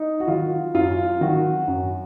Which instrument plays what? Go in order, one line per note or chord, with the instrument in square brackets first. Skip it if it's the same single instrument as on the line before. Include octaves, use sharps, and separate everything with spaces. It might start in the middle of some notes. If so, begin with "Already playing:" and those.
Already playing: [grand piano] D#4
F#4
D#3 F4
F#2 F4
D#3 F#4
F#2